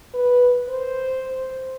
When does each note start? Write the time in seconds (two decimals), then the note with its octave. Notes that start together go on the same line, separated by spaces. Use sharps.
0.14 B4
0.69 C5